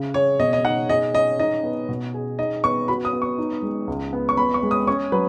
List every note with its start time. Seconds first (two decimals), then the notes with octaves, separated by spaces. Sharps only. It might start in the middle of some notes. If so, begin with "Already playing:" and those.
Already playing: C#3
0.14 G#4 C#5
0.39 B2 D#5
0.53 D#5
0.65 D#4 F#5
0.89 G#4 D#5
1.14 C#4 D#5
1.40 D#4 D#5
1.64 B3
1.89 B2
2.14 G#4
2.39 D#4 D#5
2.64 B3 C#6
2.88 F#4 B5
3.05 D#6
3.13 B3
3.22 C#6
3.38 D#4
3.63 G#3
3.87 C#2
4.13 B3
4.29 C#6
4.37 B3 B5
4.54 C#6
4.63 G#3
4.71 D#6
4.87 C#4 C#6
5.12 F#3 B4